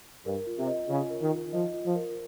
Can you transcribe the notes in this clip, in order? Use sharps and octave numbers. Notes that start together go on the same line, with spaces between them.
G2 A#4
F4
C3
D#5
C#3 F4
A#4
D#3
F4
F3 D#5
F4
F3
A#4